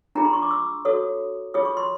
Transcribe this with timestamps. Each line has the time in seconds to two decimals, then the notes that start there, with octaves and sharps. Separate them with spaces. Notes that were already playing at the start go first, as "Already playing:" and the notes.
0.15 D4 F4 G#4 A#5
0.25 C6
0.33 C#6
0.42 D6
0.51 E6
0.85 F#4 A4 C#5 D#6
1.54 F4 G#4 C#5 D#6
1.65 C#6
1.77 C6